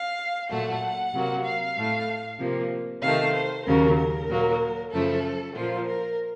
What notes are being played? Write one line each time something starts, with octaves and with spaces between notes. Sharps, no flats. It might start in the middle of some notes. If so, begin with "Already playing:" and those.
Already playing: F5
A#2 F#3 A3 F#5
C3 F#3 A#3
F5
A2 A3
C3 F3 A#3
C3 D#3 A3 F5
C5
D#2 C#3 F#3 A#3 A#4
A#4
A#2 F#3 A#3
F#2 C#3 F3 A3 A4
A#2 F3 A#3 F4
A#4